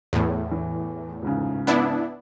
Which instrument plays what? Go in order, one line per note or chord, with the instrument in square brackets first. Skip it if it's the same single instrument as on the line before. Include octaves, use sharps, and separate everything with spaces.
[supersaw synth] E2 A2
[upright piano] E3
C#2 G#2 C#3
[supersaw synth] B3 D4 E4